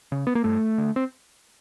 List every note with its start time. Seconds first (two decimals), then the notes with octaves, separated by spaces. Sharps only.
0.12 C#3
0.27 B3
0.35 A#3
0.44 G2 A3
0.78 D3
0.96 C4